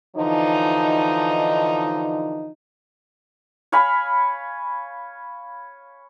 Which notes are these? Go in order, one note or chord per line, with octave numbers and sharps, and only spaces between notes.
D3 E3 F3 D#4
C#5 F5 G#5 B5